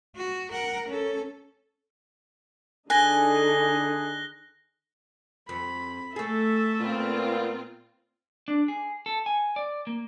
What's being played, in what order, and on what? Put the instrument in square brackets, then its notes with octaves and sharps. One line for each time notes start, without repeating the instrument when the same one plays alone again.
[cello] F#4
A#4 F#5
C#4 A4
[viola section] D3 D#4 [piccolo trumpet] G#4 [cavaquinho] G#5 [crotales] F#6 A#6 G7
[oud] F2 [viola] B5
[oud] A3 G#4 [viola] A4 E5
[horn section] A#2 B3 [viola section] C4 F4
[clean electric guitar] D4
G#4
A4
G#5
D5
A#3